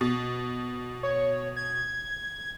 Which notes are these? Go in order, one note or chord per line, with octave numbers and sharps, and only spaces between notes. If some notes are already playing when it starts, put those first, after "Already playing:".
B2
C#5
G#6